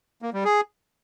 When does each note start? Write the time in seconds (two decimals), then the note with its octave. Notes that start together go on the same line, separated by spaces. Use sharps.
0.22 A#3
0.33 G3
0.45 G#4